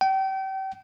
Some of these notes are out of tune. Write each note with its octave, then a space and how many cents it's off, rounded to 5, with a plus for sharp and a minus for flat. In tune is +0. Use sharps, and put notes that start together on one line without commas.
G5 -35